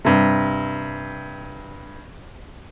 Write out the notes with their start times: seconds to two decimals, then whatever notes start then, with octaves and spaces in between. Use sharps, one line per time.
0.05 G2 C3